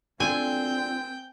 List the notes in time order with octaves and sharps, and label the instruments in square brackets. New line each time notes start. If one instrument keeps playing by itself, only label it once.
[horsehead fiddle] C4 [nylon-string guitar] D4 F4 A4 [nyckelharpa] G5 [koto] G#5